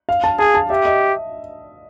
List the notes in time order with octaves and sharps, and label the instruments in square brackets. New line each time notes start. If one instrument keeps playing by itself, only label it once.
[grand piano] F5
A5
[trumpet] G#4 [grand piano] A5
[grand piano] A5
[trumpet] G4 [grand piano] E5
[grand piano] D#5